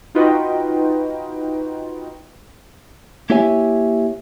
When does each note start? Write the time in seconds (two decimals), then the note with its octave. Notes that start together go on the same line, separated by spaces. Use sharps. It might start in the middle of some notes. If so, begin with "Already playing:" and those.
0.15 D#4 F4 F#4 B4 D#5 G5
3.30 A#3 E4 G4 C#5 E5 G#5